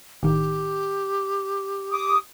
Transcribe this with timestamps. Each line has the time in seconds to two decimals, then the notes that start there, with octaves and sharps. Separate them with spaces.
0.23 A1 D#3 G4
1.92 D6 D#6